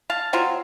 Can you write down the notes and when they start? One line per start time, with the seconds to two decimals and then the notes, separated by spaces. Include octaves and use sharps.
0.10 F5 A5
0.33 F#3 C4 F4